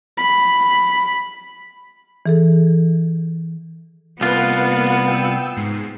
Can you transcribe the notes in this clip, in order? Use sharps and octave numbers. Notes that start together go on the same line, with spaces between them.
B5
E3 G#4 A4
C2 A#3 B3 F4 B4 F#5
G5 E6
G#2 C7